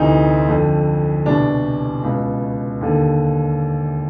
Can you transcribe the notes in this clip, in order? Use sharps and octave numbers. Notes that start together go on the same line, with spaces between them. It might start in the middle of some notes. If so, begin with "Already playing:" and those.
Already playing: D2 C3 E3 D#4
F2 D3
C2 B2 D4
C#2 B2
D#2 D3